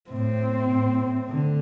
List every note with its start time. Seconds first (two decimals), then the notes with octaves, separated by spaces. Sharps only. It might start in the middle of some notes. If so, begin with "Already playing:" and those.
0.10 A2 C4
0.70 A2
1.30 D3 A3